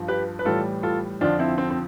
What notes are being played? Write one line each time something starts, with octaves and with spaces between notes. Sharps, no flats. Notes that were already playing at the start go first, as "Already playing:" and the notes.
Already playing: G2 F3
G4 B4
B4
A2 E3 G3 F4 A4
F4 A4
F2 D3 F3 D4 F4
C4 E4
C4
C4